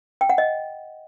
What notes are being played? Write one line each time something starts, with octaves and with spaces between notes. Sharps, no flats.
G5
F#5
D#5